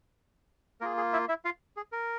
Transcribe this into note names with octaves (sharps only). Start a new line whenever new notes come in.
A#3 F4 G#4 A#4
G#4
E4 E5
E4 E5
F4 F5
G#4
A#4